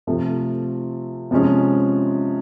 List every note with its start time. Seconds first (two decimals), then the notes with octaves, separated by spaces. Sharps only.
0.07 C3 F3 A3
1.31 C3 F3 G#3 C#4